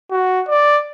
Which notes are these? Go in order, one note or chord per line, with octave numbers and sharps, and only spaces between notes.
F#4
D5